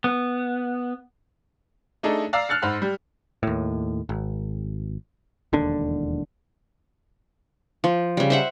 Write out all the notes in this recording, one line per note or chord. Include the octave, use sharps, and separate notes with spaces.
B3
A3 D4 D#4 G#4 A4
D5 F5 A#5 E6 F6 C7
F6 F#6 A6 C#7
G#2 C5 F#5 B5 F6
G3
D#2 A2
G#1
E1 D#2 D3 D4
F3
C#3 G3
C5 E5 F#5